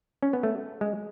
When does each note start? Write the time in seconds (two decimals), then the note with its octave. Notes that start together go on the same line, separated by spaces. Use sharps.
0.23 C#4
0.33 B3
0.43 A3
0.81 G#3